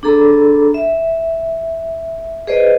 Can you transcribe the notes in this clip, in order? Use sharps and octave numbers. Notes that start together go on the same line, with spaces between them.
D4 G#4 A4 A#5 B5
E5
G#4 B4 C5 D5 D#5